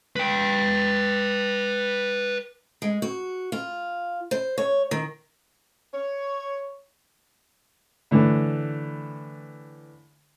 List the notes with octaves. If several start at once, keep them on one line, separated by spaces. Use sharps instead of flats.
B4 G5
G#3
F#4
F4
C5
C#5
D#3
C#5
A2 D3 E3